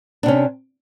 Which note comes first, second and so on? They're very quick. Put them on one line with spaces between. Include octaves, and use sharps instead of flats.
D4 C3 C#4